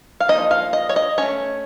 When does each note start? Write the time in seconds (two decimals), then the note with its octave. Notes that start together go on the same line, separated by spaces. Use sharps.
0.20 F5
0.28 F3 A#3 D#4 D#5
0.51 F5
0.73 D#5
0.89 C#5
0.96 D#5
1.18 A3 C#4 C#5